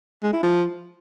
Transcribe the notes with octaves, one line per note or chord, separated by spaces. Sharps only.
G#3
E4
F3